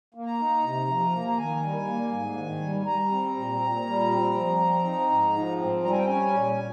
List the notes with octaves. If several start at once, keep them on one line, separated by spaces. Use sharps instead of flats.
A#3
A#5
D#4
C3
F3
A#3
A#5
D#3 G#5
G3
A#3
G#2
D#3
G3
G3 A#5
C4
A#2
A#2
G3
C4
F3
C4
D#4
G#2
F3
C4
G3 A#5
G#5
G5
C#4 G#5
A#2
A#2